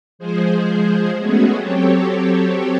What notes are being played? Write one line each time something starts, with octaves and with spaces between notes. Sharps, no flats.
F3 G#3 G#4 C5
G#3 A3 B3 C#4 F#4 G#4
F#3 C4 G4 A4 C#5